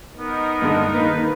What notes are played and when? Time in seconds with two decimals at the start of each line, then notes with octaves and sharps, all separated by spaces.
0.17 B3 D#4 A#4
0.62 G2 D3 G#3
0.94 D#3 A#3 B4